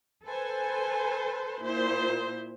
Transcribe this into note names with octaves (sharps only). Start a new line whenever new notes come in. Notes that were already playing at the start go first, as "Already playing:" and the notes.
A4 B4 C5 G#5
A#2 E4 C5